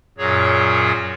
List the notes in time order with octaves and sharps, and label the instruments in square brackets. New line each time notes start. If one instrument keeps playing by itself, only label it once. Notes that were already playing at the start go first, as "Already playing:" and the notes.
[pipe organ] F#2 A#2 F#3 G#4 C#5